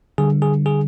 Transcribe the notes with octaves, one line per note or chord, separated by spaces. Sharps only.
D3 G3 G#4
G#4
G#4